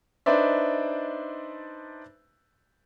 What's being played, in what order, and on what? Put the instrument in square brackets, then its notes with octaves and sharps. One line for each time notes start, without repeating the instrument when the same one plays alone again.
[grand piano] D4 D#4 B4 C5 D5 E5